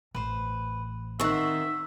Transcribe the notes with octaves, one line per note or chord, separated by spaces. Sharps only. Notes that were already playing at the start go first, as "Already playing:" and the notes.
A1 B4 C5
D#3 C4 E5 F#5 C#6